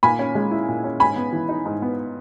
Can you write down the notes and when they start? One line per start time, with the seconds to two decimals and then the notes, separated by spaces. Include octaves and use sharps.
0.03 A#2 G#5 B5
0.19 C#4
0.35 G#3
0.51 E4
0.68 A#2
0.84 C#4
1.00 G#2 G#5 B5
1.16 B3
1.32 E3
1.49 D#4
1.66 G#2
1.82 B3